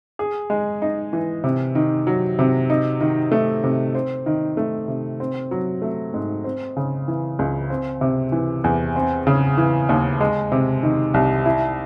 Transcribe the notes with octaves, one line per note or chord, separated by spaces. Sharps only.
G#4
G#3
D#4
E3
C3
D#3
F#3
C3
D#4
D#3
A3
C3
C4
D#3
A3
C3
C4
F#3
A3
G#2
C4
C#3
E3
C#2
C4
C3
E3
E2
C4
C#3
E3
D#2
G#3
C3
D#3
C2
E4